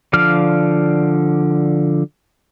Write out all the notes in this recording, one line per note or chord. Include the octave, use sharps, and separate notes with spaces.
D3 F3 D5 F5 F6